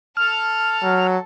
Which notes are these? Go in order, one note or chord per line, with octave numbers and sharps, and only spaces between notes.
A4 A5 F6
F#3